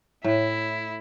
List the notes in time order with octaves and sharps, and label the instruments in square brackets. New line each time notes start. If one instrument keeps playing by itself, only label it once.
[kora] A2 [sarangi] E4